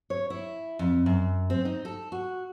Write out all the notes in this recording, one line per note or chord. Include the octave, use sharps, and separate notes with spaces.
C#5
E4
F2
F#2
C4
D#4
A4
F#4